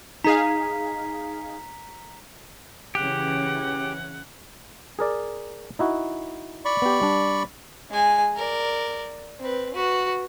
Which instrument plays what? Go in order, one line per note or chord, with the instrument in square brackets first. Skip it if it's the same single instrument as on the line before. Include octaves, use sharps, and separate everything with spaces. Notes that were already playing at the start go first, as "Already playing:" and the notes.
[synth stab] D#4 G#4 F5 [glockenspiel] A#5 B6
[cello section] C#3 E3 C#4 [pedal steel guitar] G4 [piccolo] F#5
[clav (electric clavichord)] G#4 A#4 D5
D#4 E4 F#4
[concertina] D5 B5 C#6
[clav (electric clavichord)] B3 G4
G3 D4
[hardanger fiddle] G#3 G#5
A#4 D5
C4 B4
F#4 B4